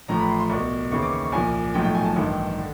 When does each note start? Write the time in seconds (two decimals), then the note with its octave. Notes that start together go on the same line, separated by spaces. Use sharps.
0.08 A1 A2 F3 A#5
0.19 B5
0.29 C6
0.39 C6
0.50 C2 B2 C#6
0.91 D#2 C#3 E3 C#6
1.02 D6
1.12 C#6
1.23 C#6
1.32 C2 A#2 F3 G#5
1.74 B1 A2 F3 G5
1.84 G5
1.94 G#5
2.05 A5
2.16 A1 G2 D#3
2.59 D3